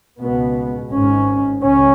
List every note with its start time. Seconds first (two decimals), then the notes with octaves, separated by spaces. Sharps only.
0.19 C#2 B2 B3
0.90 G#1 G#2 C#4
1.62 C#2 C#4